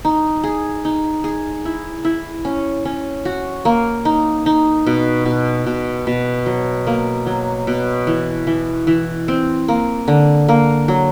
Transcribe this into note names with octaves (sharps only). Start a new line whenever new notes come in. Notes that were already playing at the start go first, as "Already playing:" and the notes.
D#4
G#4
D#4
G#4
E4
E4
C#4
C#4
F#4
A#3
D#4
D#4
B2
B2
B2
B2
F#3
A#3
F#3
B2
E3
E3
E3
C4
A#3
D3
A#3
F#3